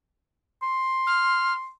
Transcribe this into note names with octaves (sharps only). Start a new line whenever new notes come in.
C6
F6